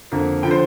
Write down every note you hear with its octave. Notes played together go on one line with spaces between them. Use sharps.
F2 D3 A#3
D3 F3 G5
C5